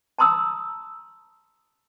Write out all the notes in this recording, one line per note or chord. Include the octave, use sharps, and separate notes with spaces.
A5 A#5 C6 D#6 E6